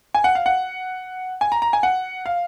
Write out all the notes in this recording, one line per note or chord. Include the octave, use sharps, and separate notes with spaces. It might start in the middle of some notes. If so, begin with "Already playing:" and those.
G#5
F#5
F5
F#5
G#5
A#5
A#5
G#5
F#5
F5